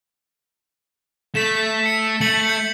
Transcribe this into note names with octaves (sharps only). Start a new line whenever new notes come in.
A3 B6 E7
C#7
A3 C#7 F#7
G6 C#7